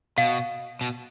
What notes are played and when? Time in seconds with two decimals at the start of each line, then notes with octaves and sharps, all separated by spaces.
0.18 B2 F5
0.81 B2